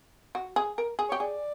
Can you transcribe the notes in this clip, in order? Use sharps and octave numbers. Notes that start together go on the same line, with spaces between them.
F#4
G#4
A#4
G#4
G4 C#5
G#4 D5